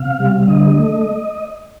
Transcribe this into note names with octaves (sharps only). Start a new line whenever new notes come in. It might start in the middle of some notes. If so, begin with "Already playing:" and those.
Already playing: C3 F5
G3
F5
D3 D#5
A3